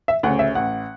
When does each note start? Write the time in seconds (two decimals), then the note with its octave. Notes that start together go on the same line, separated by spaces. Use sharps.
0.08 E5
0.23 D2 F#5
0.27 C#3
0.39 E5
0.55 A1 F#5